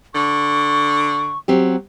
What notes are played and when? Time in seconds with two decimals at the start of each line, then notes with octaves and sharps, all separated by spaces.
0.14 D3 C#6
1.48 F#3 C4 G4